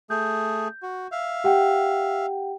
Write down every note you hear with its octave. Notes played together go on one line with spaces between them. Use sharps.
A3 G#4 G6
F#4
E5 F5
G4 F#5 G5